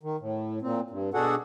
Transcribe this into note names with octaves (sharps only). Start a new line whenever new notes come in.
D#3
A2
A#2 C4
G2
B2 D4 F#4 G#4 A4 F#5